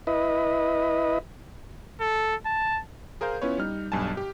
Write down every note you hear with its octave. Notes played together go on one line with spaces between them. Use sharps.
E4 B4 D#5
A4
A5
G#4 A#4 C5 F5 G6
B3 C#4 E4 F4 B4 C#5
G3 D#4 F6
B1 G2 G#5 A5
G4